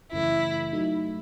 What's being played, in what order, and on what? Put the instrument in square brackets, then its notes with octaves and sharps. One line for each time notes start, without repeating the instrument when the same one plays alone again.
[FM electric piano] F#2 C#3 E3 A3 [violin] E4
[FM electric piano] F#3 A3 D#4